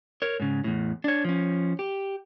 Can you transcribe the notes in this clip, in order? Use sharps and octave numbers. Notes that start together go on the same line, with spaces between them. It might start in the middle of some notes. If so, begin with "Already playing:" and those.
A#4 C#5
G#2 C#3
E2 A2
D4 C#5
F3 C#4
G4